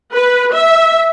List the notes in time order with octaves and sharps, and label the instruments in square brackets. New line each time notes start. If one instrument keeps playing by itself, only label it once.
[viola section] B4
E5